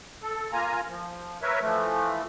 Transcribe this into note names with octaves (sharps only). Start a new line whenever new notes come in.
A4
A#3 F4 G#5 A#5
F3
A#4 B4 C#5 E5
E3 F3 A3